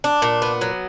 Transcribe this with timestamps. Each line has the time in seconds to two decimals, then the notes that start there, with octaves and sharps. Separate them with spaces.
0.04 D4
0.22 A#2
0.42 B3
0.61 F#3